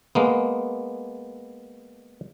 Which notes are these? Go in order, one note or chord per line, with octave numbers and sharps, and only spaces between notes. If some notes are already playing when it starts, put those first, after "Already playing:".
G#3 A#3 B3